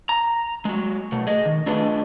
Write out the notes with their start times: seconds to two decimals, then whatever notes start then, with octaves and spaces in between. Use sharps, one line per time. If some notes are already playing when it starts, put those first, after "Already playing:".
0.09 A#5
0.65 F#3 G#3
1.12 B2 A3
1.27 G#4 D#5
1.45 D#3
1.66 A3 D4 F4 G#4 B4 D#5